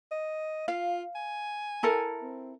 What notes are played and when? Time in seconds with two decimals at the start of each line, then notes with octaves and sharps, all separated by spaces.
0.11 D#5
0.68 F4 F5
1.15 G#5
1.83 E4 A4 A#4
2.22 C4